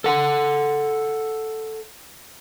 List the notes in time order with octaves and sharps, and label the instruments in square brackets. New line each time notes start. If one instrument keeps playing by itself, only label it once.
[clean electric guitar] A4 F#5